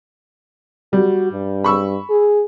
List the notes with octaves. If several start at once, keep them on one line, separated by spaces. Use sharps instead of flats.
G3 F#4
G2
B5 C#6 E6
G#4